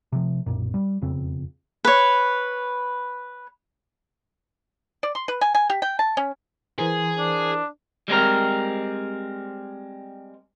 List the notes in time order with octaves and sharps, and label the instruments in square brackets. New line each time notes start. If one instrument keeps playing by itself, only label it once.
[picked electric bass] C3 F3
B1 F#2 A#2
G3
E1 F2 C#3 C4
[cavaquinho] B4 C#5
[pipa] D5
C6
B4
G#5
G#5
G4
G5
A5
C#4
[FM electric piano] E3 A#4 C5 [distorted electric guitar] G#4
[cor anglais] D4
[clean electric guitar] G3 G#3 C4 A#4